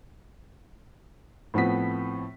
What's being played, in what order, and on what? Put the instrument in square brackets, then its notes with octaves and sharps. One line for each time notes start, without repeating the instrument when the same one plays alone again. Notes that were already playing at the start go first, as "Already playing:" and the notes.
[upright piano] A2 F3 B3 C4 B6